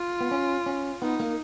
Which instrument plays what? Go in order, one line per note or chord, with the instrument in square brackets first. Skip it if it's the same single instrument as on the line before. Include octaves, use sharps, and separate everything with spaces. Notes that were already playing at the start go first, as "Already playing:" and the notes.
Already playing: [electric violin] F4
[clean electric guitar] B3
C#4
C#4
[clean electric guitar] B3 [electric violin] D#4
[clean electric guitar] A#3